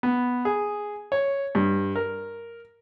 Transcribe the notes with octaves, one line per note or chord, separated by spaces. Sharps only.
B3
G#4
C#5
G2
A#4